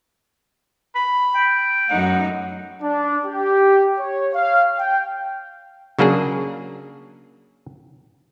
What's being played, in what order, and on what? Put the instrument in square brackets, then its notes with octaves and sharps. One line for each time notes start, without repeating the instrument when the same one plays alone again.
[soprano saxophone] B5
[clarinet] G5
[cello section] F#2 A3 D#4 [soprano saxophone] F#5
[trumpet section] D4
G4
C#5
F5
G5
[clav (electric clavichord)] C#3 F#3 A#3 D4 G#4